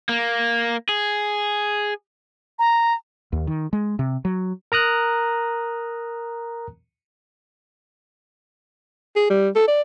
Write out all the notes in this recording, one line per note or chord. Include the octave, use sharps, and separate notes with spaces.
A#3
G#4
A#5
D#2
D#3
G#3
C3
F#3
A#4 A#5 D#6 F#6
G#4
G3
A4
D5